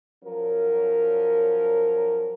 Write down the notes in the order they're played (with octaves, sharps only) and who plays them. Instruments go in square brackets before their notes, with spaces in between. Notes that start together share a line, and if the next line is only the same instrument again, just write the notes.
[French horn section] F3 F#3 C#4 A#4